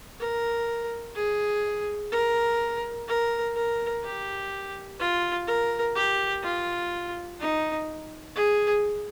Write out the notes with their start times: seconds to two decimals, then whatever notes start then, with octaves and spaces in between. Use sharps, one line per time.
0.20 A#4
1.16 G#4
2.12 A#4
3.08 A#4
3.56 A#4
4.04 G4
5.00 F4
5.47 A#4
5.95 G4
6.43 F4
7.40 D#4
8.36 G#4